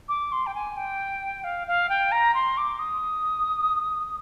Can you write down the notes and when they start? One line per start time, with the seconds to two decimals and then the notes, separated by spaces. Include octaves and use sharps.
0.09 D6
0.32 C6
0.47 G5
0.55 G#5
0.77 G5
1.44 F5
1.67 F5
1.89 G5
2.12 A#5
2.34 C6
2.57 D6
2.79 D#6